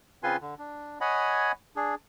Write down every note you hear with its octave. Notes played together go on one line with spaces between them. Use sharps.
C#3 C4 F4 B4 G#5 C6
D3
D4
C#5 D#5 F#5 G#5 B5
D4 G#4